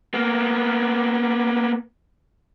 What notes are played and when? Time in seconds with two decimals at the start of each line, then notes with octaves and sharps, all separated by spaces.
0.14 A#3 B3